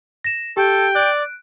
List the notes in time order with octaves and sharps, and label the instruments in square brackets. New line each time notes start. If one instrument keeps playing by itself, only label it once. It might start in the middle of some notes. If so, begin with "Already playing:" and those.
[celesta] A#6 E7
[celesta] G4 [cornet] A4 [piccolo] G5
[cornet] D5 [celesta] F#6 D7